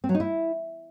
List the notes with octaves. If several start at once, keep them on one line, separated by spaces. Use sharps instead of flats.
C4
F#3
D#4
E4